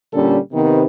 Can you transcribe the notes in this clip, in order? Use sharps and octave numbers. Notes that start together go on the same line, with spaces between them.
A#2 D3 G3 C#4 A4
C3 D#3 B3